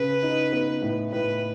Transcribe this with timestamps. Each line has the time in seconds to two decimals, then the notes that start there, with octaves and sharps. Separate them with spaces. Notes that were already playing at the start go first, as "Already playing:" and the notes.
Already playing: C#3 B4
0.23 D#4
0.52 B3
0.82 A2
1.12 A2 B4